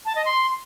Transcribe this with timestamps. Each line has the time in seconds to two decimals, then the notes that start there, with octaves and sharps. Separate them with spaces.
0.05 A5
0.15 D#5
0.25 C6